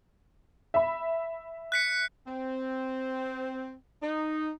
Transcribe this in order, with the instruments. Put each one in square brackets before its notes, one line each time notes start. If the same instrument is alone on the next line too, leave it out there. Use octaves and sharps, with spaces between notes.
[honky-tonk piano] E5 B5
[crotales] F#6 B6 C#7
[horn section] C4
D#4